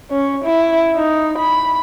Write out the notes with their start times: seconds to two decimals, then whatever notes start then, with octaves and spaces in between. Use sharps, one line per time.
0.11 C#4
0.45 E4
0.95 D#4
1.38 B5